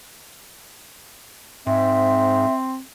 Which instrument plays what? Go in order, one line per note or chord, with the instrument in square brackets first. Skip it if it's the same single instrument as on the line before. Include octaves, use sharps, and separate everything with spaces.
[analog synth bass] G#2 [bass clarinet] C4 [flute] E5